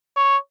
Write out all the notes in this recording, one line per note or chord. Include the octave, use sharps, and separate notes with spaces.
C#5